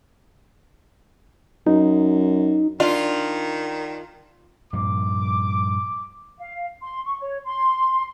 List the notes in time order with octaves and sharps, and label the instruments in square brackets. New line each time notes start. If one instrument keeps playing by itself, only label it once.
[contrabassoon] F#2 [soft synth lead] D#4
[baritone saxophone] D#3 [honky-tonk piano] D4 [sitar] F4
[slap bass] G2 A#2 F3 [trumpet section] D6
[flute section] F5
C6
C#6
C#5
C6